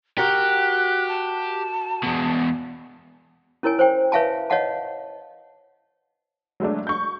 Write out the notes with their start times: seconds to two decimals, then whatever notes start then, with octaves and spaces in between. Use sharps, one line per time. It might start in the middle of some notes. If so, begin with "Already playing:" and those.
0.18 F#4 G4 A#4 F#6
1.09 A5
2.04 E2 B2
3.63 C#4 E4 A#4 C#5 G#5
3.79 C5 C#5 G5
4.12 B4 C#5 E5 F5 G#5 A5
4.50 C#5 D#5 F5 F#5 A5
6.60 F#3 G#3 A3 D4
6.87 C#6 G6